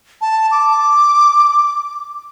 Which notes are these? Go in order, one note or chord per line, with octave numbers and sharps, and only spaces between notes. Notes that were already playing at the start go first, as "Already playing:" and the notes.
A5
D6